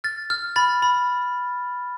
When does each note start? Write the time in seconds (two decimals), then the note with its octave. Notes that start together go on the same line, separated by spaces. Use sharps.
0.04 F6 A6
0.30 F6
0.56 B5 A6
0.82 B5